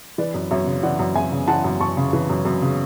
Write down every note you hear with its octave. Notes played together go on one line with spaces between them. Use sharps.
E3 B4 D5
F#2
F#2 C#5 E5
C#3
E3 D5 F#5
F#2
F#2 E5 G#5
C#3
E3 F#5 A5
F#2
F#2 A5 C#6
C#3
E3
F#2
F#2
C#3